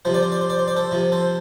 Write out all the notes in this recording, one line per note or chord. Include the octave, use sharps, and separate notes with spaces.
C3 F3 C5
D5
C5
D5
C5
D5
C5
D5
A4 C5
C3 F3
A4 C5